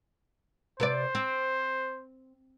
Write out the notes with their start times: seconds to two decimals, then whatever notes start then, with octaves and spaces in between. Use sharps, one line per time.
0.80 C3 B4 C5 D5
1.15 C4